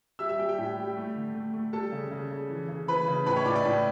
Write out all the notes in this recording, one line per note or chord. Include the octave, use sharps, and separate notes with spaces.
G3 E5 E6
E5 E6
G3 G4 G5
G4 G5
A2
G3
A3
D3
A3
A3
G3 A4 A5
C#3
C#3
C#3
E3
C#3
E3 B4 B5
C#3
A2 B4 B5
C#5 C#6
A2 D5 D6
D5 D6
A2